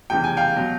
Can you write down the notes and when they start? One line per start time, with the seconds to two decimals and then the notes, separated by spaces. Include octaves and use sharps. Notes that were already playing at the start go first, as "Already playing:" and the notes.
0.10 F1 E2 C#3 E3 G5
0.24 G#5
0.37 F5 G5
0.56 B2 F#3